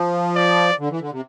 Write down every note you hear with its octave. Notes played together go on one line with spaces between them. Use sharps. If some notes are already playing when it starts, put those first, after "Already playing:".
Already playing: F3
D5
D3
E3
D3
C3